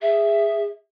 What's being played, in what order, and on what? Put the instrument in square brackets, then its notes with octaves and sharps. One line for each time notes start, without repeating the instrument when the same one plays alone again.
[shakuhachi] G#4 [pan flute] E5